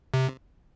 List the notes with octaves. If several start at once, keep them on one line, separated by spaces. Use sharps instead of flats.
C3